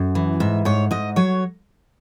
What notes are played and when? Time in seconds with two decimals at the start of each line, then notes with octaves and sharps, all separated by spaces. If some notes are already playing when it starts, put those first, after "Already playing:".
Already playing: F#2
0.15 E3
0.40 G#2 E5
0.65 G#2 C#5
0.91 G#2 D#5
1.16 F#3 C#5